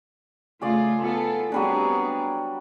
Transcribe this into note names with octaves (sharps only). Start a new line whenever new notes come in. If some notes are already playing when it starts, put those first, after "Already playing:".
C#3 A3 F4 G#4 D5
B3 F4 A4
F#3 G3 B3 C4 D4 G#4